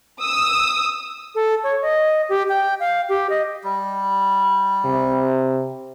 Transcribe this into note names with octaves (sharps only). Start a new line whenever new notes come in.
D#6 E6
A4
C#5
D#5
G4
G5
F5
G4
D#5
G3
C3